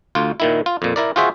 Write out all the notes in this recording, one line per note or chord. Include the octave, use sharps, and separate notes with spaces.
D2 F4
A#2 D#3 E4
F4
F2 A#2
E4 A#4 D5
F4 F#4 G#4 C5 E5